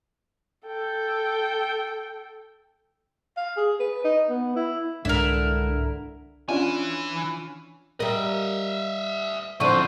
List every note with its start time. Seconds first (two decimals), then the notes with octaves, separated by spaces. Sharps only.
0.66 A4 G5
3.37 F5
3.57 G#4
3.80 B4
4.04 D#4
4.30 B3
4.56 E4
5.05 C2 G#2 D3 D4 E4 A#4
6.49 E3 C#4 D4 F4 G#5
8.00 G3 A#4 D#5 E5
9.60 D3 F3 C4 E4 C5 C#6 D#7